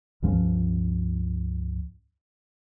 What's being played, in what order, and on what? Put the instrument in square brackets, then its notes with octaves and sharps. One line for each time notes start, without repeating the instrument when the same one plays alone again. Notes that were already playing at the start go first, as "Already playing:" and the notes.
[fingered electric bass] C#2 G2 F3 C#4